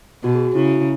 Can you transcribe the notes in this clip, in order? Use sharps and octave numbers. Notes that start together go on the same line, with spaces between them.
B2 F#4
G#4
F#4
C#3 E4